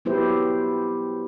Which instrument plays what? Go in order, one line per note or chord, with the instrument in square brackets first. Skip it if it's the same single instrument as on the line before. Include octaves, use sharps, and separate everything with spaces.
[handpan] F#3 B3 E4 G4 C5